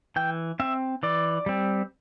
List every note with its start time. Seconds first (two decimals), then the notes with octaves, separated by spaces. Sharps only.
0.16 E3 G5
0.60 C4 E5
1.03 E3 D5
1.46 G3 C4